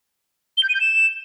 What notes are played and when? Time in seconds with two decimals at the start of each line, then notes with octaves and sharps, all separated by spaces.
0.57 G7
0.63 G6
0.69 D#7
0.75 G6
0.81 E7